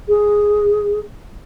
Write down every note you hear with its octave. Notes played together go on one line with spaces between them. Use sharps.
G#4